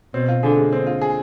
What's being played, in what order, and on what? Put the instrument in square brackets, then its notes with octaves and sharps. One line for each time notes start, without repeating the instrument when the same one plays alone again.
[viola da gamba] B2 [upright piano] C4
[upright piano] F4
[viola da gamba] D3 [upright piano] G#4
[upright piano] G#3
[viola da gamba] D3 [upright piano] C4
[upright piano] F4
G#4